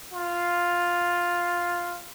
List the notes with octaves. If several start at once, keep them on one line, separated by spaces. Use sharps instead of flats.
F4